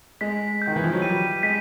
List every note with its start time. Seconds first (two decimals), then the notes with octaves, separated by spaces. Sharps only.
0.21 G#3 B6
0.62 G6
0.67 D#3
0.76 E3
0.84 F3
0.93 F#3
1.01 G3 D#7
1.43 G#3 B6